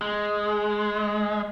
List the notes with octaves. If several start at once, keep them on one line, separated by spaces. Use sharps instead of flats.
G#3